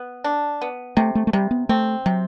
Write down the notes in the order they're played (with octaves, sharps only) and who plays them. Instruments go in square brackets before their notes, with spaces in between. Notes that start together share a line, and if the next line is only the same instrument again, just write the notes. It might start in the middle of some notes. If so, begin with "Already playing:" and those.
Already playing: [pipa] B3
D4
B3
[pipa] C3 [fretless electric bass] A3
[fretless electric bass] A3
A3
[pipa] C3 [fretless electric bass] G3
[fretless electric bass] B3
[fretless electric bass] A3 [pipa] C4
[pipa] C3 [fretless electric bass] F#3